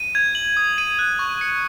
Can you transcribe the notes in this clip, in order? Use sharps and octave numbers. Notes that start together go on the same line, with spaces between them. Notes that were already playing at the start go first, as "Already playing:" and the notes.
Already playing: D#7
G#6
F#7
D#6
D#7
F#6
C#6
C#7